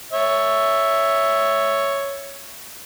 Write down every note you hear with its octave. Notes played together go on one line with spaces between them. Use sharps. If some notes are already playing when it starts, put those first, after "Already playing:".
C#5 E5